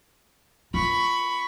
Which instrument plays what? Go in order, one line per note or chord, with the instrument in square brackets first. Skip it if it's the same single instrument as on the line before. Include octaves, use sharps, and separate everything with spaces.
[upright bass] F4 [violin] B5 C#6